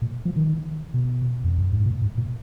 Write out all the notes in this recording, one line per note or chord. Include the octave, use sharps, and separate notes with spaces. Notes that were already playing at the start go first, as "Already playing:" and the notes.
A#2
F3
D#3
B2
F2
F#2
G#2
A#2
G#2
A#2